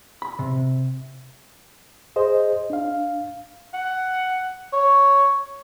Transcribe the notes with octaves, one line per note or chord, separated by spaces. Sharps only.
B5
C3
G#4 C5 D#5
D4 F5
F#5
C#5